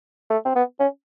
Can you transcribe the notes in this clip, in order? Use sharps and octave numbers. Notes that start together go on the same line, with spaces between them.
A3
C4
B3
C#4